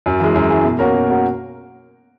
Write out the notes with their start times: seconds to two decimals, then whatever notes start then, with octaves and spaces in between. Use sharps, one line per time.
0.06 F#2
0.20 E3 G#3
0.36 F#2
0.50 E3 G#3
0.64 B2
0.79 A#3 C#4 F#4 A#4
0.94 B2
1.08 A#3 C#4 F#4 A#4